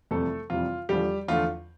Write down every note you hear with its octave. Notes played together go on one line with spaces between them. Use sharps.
F2 C3 E3 G3 A3 A4
F2 C3 E3 G3 F4
E2 D3 F3 G3 A3 G4
E2 D3 F3 A3 F4